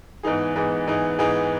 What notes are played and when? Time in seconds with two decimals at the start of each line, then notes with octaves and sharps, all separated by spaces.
0.23 G#2 E3 B3 D#4 G#4
0.56 G#2 E3 B3 D#4 G#4
0.87 G#2 E3 B3 D#4 G#4
1.19 G#2 E3 B3 D#4 G#4